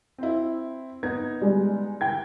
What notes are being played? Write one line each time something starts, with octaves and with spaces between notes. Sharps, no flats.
C4 E4
B3 D#4 G#6
G3 G#3
G5 G#6